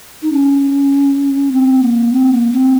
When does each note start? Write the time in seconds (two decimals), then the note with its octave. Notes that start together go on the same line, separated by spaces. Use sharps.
0.22 D#4
0.32 C#4
1.52 C4
1.82 A#3
2.12 C4
2.32 A#3
2.52 C4